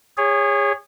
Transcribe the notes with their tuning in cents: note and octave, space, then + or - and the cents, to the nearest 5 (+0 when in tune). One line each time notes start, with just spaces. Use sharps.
G#4 -30 C#5 +0